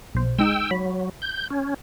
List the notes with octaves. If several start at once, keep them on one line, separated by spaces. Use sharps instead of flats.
B1 C5
G#3 D#4 G5 E6 E7
F#3 B5
G6
C#4